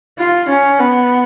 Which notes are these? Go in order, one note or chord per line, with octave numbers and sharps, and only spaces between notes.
F4
C#4
B3